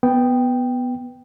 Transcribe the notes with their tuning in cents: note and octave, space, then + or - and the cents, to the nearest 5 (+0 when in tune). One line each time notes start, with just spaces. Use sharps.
B3 +0 G5 +0